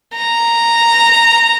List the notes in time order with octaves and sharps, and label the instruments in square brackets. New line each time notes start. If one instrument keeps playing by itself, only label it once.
[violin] A#5